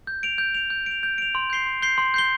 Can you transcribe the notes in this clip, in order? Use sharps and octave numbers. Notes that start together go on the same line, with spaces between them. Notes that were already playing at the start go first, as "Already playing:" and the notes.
G6
D7 F7
G6
D7 F7
G6
D7 F7
G6
D7 F7
C6
G6 C7 G7
C6
G6 C7 G7
C6
G6 C7 G7